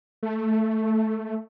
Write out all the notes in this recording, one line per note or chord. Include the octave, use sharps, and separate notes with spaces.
A3